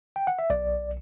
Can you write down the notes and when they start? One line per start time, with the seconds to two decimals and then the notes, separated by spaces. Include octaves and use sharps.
0.16 G5
0.27 F#5
0.39 E5
0.50 B1 D5